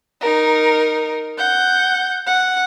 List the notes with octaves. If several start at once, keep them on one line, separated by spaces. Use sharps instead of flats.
D#4 A#4
F#5 G6
F#5